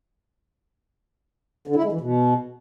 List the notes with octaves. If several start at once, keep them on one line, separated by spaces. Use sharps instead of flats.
D3
E4
G#3
E3
B2